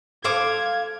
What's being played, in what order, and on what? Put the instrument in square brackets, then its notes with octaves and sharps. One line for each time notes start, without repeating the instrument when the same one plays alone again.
[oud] A4 [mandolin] C5 F5 D6 [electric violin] G#6